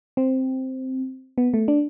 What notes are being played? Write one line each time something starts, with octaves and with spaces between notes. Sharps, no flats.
C4
B3
A3
D4